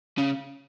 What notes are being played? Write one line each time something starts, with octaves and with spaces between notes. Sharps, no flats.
C#3